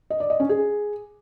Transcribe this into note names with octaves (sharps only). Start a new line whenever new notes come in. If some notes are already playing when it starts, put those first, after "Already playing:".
D#5
D5
D#5
C#4
G#4